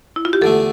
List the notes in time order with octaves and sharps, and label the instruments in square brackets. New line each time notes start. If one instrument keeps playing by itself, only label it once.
[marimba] E4
F4
G4
[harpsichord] E2 D3 A3 [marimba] A4